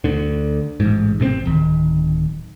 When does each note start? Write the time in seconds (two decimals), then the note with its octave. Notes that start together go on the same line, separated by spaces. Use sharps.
0.04 D2 D3
0.80 A1 G#2
1.20 A1 C3 G3 C4
1.45 D1 D#3